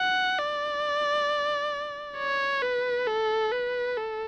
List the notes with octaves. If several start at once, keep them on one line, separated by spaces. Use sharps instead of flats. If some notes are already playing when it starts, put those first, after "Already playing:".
Already playing: F#5
D5
C#5
B4
A4
B4
A4